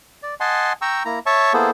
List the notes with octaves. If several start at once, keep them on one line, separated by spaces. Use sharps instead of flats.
D5
D#5 F#5 G#5 A5 C6
G5 A#5 C#6 E6
A#3 E4 A#5
C#5 E5 A5 C#6
A#3 B3 E4 G#4 A4 C5